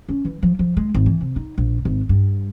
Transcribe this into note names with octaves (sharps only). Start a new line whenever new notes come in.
C#4
E3
F3
F3
G#3
G#1
E3
C3
D#4
A#1
G#1
G2